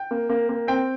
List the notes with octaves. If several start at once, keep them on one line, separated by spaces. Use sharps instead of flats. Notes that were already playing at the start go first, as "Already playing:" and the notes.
Already playing: G5
A#3
A#3
A#3
C4 G5